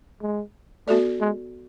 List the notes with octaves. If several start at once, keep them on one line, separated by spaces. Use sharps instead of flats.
G#3
A3 B3 F#4 A4 D5
G#3